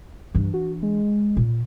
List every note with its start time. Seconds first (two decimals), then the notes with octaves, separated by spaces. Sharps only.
0.35 G2 E3 D4
0.54 F#4
0.83 G#3
1.37 A#2